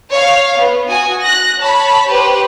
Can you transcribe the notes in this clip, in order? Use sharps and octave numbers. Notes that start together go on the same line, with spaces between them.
C#5 F5
B3
F#4 G#5 D#6
F#6 A#6
C#5 A5 B5
G4 B4 C5